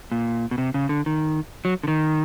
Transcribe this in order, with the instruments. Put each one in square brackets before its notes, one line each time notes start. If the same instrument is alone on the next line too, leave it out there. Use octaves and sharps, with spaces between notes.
[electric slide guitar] A#2
B2
C3
C#3
D3
D#3
F#3
D3
D#3